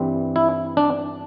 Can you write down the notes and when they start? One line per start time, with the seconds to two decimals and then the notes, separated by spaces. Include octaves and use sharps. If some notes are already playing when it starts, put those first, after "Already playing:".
Already playing: G2 E3 G3 C4
0.36 E4
0.77 D4